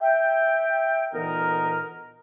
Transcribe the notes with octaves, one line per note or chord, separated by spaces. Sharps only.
E5 G5
D2 A#2 E3 B3 D#4 A#4